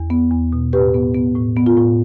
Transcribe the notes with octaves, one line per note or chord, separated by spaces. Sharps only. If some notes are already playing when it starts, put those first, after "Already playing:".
Already playing: E2
B3
E2
B2
A2 G4 B4
B3
B3
A2
B3
F4
A2